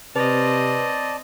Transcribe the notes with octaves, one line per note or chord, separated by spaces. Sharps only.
C3 C4 B4 D5 D#5 A5